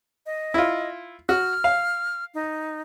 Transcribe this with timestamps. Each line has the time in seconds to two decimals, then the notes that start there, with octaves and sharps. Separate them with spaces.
0.26 D#5
0.54 E4 F4
1.29 F#4 F6
1.64 F5
2.34 D#4